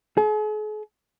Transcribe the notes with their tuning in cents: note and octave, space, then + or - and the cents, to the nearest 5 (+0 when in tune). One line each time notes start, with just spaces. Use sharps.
G#4 +45